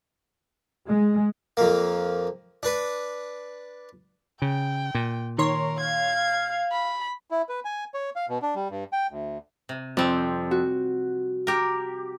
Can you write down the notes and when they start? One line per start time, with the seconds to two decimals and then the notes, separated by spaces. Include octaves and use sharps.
0.89 G#3
1.57 F2 A#3
2.63 D4 B4
4.42 C#3 G5
4.95 A#2
5.38 D#3 A#4 C#5 C6
5.80 F5 G#6
6.72 B5
7.30 E4
7.49 B4
7.65 G#5
7.94 C#5
8.16 F5
8.29 B2
8.42 D4
8.55 G3
8.71 G2
8.92 G5
9.11 D2
9.69 C3
9.97 F2 G3 C4
10.51 F#4
11.47 G4 A#4